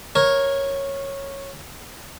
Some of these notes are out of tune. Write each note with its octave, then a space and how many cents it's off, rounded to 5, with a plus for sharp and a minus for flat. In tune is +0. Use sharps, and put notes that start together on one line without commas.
A#4 +10 C#5 -10